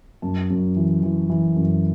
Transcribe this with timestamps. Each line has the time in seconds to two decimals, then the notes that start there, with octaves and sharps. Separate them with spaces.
0.22 F#2 A5
0.50 F#2
0.76 E3
1.03 E3
1.29 E3
1.56 F#2